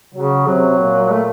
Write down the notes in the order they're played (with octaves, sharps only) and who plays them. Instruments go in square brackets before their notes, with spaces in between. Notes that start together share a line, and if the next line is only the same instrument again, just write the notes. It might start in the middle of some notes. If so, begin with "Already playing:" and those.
[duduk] C#3 [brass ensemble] F#3
[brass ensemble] C3 [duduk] F#3
[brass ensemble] A#2
[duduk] A3